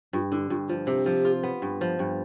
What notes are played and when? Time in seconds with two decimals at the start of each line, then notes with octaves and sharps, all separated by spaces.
0.13 G2 F4
0.31 D3 E4
0.50 G2 F4
0.68 F3 F4
0.87 C3 G4
1.06 F3
1.25 F4
1.43 B3
1.62 G2
1.81 F3
1.99 G2